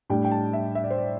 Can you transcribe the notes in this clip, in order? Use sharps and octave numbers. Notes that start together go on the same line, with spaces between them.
A2 G3 D4 G5
G5
A5
E5
E5
D5
C5
D5